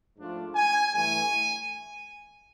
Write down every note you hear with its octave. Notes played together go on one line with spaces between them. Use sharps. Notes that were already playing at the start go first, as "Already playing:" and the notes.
G#2 F3 A3 D4 F4
G#5
G2 E3 A3 G#5